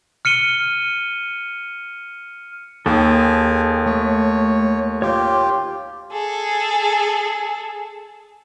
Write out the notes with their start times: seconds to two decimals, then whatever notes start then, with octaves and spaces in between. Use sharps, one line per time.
0.25 F6 C#7 D#7 G7
2.86 D#2 G#4 A4 G5
3.86 A3 C#5
5.02 F4 G4 C#5 D6 G6
6.12 G#4 A4